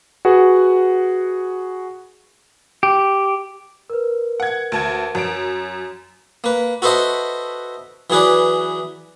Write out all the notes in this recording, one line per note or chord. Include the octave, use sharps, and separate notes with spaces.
F#4 G#4 B4 F#5
G4
A#4 B4
F#5 G#6
D2 A5 G#6
F#2 D7
A#3 B4
F#4 A4 B4 C5 D#5 E5
E3 F#3 G#4 B4 D5